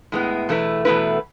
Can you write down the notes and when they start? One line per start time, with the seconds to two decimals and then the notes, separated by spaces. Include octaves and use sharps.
0.12 A2 G#3 B3 E4
0.49 E2 B2 A3 E4 B4
0.85 E2 B2 A3 E4 B4